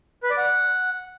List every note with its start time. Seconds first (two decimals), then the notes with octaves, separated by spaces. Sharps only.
0.23 B4
0.30 D5
0.38 F#5